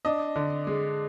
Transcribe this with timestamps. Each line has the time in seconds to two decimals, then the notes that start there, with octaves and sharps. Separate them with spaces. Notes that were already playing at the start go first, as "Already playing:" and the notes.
0.05 D4 D#5
0.36 D3
0.67 G#3